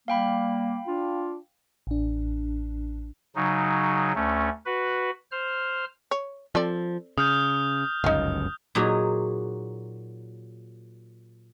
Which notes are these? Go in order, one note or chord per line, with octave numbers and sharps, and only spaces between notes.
G3 A#3 F5 G5 B5
D4 F4
A1 D4
C#3 F#3 D#4
D2 A3 C#4
F#4 B4
C5 F6
C#5
F3 C4 A4 D5
C#3 D#6 F6 G6
G1 C#2 F#2 D#4 F5
A#2 F#3 D#4 F#4 G#4